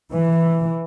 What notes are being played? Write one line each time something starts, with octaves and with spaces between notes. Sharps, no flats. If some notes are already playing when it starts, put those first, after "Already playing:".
E3